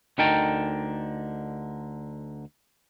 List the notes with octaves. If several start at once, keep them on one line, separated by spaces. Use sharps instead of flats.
D2 D3 D#4 A#4 G5 A5